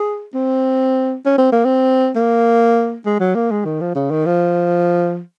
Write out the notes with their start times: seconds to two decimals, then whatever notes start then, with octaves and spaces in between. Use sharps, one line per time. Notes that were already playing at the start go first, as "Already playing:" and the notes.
Already playing: G#4
0.34 C4
1.25 C#4
1.38 C4
1.52 A#3
1.65 C4
2.15 A#3
3.06 G#3
3.20 F#3
3.35 A#3
3.51 G#3
3.65 D#3
3.80 F3
3.95 C#3
4.11 D#3
4.25 F3